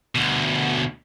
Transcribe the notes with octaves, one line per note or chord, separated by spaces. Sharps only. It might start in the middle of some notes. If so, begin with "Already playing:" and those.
D2 B2